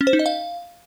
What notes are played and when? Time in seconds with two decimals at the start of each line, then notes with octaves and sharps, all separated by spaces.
0.01 C#4
0.07 C5
0.13 D#4
0.19 D#5
0.26 F5